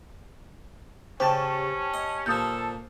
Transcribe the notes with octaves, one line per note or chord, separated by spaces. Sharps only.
C#3 C#4 G4 C5 A5
D#5
A#2 F3 A4 D#6 G6